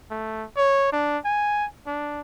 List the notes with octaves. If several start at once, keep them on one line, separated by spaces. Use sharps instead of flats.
A3
C#5
D4
G#5
D4